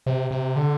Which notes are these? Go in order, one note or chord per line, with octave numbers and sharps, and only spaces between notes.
C3
C3
D3